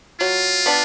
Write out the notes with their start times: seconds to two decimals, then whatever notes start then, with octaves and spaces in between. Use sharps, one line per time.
0.20 F#3 F4
0.66 B3 D4